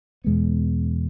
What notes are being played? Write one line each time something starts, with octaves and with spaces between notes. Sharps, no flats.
E2 B2 G#3 B3